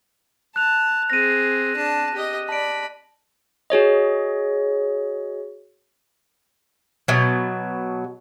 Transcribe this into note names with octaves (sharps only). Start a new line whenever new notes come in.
A5 F#6 F7
C4 G#4 A#6 D#7
D4 A5
G4 D#5
D5 A5 B5 D7
F#4 G#4 C#5 D#5
B2 F#3